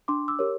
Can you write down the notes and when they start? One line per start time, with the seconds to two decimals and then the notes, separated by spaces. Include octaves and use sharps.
0.08 D4 C6 D6
0.28 D6 E6
0.39 G4 A#4 C#5